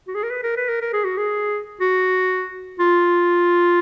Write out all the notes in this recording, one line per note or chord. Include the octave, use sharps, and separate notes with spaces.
F#4
G#4
A#4
B4
A#4
B4
A#4
A#4
G#4
F#4
G#4
F#4
F4